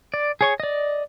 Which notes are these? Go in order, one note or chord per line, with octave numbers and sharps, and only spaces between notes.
D5
G#4 C#5 C#6
D5 D#5